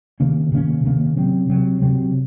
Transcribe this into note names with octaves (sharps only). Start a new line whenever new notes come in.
C3 D#3 A#3 C#4
C3 D#3 A#3 C#4
C3 D#3 A#3 C#4
C3 F#3 C4
C3 F#3 C4
C3 F#3 C4